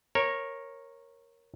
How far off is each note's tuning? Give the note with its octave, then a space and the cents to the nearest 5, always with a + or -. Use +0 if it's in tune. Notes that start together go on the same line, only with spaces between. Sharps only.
A#4 +0 C#5 -15